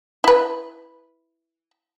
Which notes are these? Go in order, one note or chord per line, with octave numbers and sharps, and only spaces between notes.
E4 B4